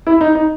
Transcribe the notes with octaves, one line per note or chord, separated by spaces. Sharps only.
E4
D#4
D#4